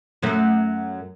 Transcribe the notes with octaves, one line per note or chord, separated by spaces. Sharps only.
F#2 F#3 A3